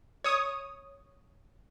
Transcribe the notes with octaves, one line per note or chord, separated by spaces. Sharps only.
C#5 D#6